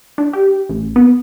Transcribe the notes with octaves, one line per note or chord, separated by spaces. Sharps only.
D4
G4
A1
B3